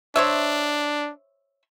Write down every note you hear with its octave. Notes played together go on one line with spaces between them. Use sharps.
D4 C5 C#5 E5